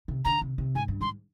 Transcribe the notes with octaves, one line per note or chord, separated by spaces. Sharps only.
C3
D3 A#5
C3
C3
G#2 G#5
G2
G#2 C6